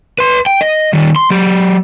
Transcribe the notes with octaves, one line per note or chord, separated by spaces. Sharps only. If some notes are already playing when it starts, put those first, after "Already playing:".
B4 C6
G5
D#5
D#3 G3
C6
F#3 G4